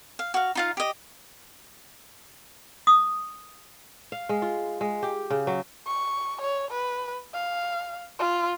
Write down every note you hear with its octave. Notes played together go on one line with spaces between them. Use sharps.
F5
F#4 F5
D#4 F4 F5
G4 D#5
D#6
F5
G#3
F4
G#3
G4
C#3
F#3
C#6
C#5
B4
F5
F4